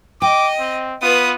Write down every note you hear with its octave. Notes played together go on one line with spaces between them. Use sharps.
D#5 G5 D6
C4
B3 F4 B4 D#6